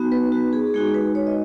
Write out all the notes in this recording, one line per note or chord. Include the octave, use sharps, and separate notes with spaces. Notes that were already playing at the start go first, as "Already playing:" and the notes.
Already playing: B3 D#4 F#4
B4
F#4
G#4
G#3 D#4 F#4 G#4
B4
C#5
D#5